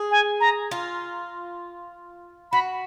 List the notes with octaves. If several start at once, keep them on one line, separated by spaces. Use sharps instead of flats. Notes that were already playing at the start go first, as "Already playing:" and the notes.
Already playing: G#4
G#5
A#5
F4
F#4 B5